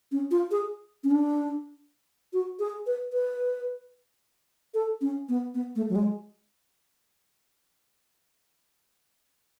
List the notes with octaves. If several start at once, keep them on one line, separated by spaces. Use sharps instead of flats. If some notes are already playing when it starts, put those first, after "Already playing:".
C#4
F4
G#4
C#4
D4
F#4
G#4
B4
B4
A4
C#4
B3
B3
A3
F#3
G#3